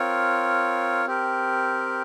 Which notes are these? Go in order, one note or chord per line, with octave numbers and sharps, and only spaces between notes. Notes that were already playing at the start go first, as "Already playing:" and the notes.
Already playing: C4 F4 A#4 C#5
C4 G4 A#4